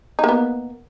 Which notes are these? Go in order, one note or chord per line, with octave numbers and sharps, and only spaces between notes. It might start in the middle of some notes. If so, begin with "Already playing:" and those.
A#3 B3 D#4